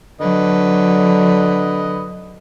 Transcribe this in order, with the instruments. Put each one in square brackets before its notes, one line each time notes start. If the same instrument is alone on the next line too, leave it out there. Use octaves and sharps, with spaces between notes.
[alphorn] D3 [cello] F#3 [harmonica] B4 D#5